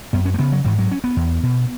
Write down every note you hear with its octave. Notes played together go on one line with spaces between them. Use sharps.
F#2 B3
C#4
A3
C#3 B3
F#3
G#2 E3
F#3
C#4
B3
E2
B2